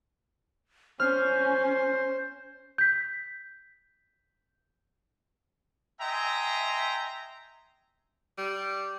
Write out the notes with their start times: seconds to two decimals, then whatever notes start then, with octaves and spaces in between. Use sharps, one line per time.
1.00 C#4 C5 F6
2.78 G6 B6
6.00 D#5 E5 G5 G#5 A#5 C6
8.38 G3